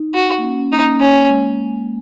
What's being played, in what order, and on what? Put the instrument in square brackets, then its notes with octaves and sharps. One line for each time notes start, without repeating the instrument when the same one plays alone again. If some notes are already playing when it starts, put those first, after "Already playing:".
Already playing: [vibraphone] D#4
[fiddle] F#4
[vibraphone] A#3
C#4
C#4
[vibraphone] A#3 [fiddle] D#4
[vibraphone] C#4
A#3
[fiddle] C#4
[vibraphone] G#3